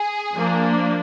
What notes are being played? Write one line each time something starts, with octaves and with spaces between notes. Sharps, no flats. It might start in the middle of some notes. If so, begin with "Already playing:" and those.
Already playing: G#4
F3 A#3 D4